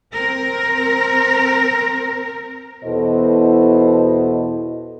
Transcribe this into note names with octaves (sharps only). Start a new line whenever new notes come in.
C4 A#4
E2 B2 E4 A4 C5 D#5